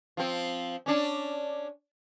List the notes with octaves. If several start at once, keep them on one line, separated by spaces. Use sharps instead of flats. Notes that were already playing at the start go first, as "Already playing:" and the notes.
F3 C4
C#4 D4